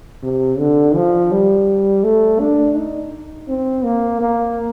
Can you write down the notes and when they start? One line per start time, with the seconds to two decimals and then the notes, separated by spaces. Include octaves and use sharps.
0.23 C3
0.59 D3
0.95 F3
1.31 G3
2.04 A3
2.40 D4
2.76 D#4
3.48 C4
3.84 A#3
4.21 A#3